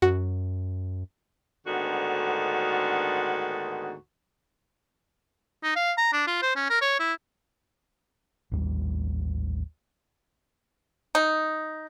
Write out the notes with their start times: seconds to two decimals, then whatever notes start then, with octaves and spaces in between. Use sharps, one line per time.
0.02 F#2 F#4
1.66 D2 G#2 D3 D#3 B3 F#4
5.63 D#4
5.76 F5
5.98 A#5
6.13 D4
6.27 F4
6.43 C5
6.56 C#4
6.70 A#4
6.82 C#5
7.00 E4
8.52 A1 D#2 G3
11.15 D#4